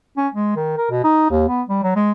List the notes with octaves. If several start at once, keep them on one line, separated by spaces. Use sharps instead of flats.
C#4
G#3
D#3
A#4
B2
D#4
D#2
B3
G3
F#3
G#3